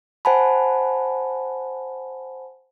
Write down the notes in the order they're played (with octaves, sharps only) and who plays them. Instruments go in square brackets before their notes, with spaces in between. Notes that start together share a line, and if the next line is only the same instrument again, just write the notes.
[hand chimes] C5 F#5 G#5 A5 B5